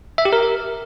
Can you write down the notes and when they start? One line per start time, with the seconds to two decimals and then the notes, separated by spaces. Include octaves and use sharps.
0.18 E5
0.25 G4
0.33 A#4